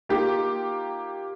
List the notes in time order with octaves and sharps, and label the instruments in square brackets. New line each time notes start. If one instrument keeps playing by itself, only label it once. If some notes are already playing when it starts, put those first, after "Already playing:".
[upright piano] A#3 D#4 F4 G4